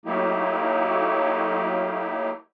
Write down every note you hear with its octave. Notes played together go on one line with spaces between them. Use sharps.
F#3 A3 A#3 D#4 E4 G4